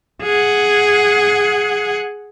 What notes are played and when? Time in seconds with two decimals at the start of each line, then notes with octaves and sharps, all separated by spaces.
0.22 G#4 F#5